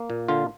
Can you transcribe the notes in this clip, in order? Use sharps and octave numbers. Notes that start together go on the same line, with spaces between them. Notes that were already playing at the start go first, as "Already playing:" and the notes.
Already playing: A#3
A#2
D3 F4